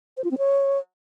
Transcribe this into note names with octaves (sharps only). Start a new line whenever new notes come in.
C5
F4
C4
C#5